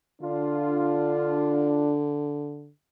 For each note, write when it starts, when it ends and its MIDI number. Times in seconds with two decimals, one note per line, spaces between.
0.22 2.70 50
0.22 2.00 62
0.22 1.94 65